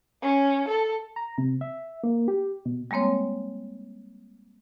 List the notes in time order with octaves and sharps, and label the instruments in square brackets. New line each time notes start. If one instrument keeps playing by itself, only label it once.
[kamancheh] C#4
A4
[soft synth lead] A#5
C3
E5
A#3
G4
B2
[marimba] G3 G#3 A#3 C4 C#5